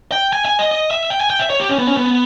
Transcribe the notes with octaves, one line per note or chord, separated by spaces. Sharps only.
G5
G#5
G#5
D#5
D#5
E5
G5
G#5
G5
E5
C#5
G4
C#4
B3
C#4
B3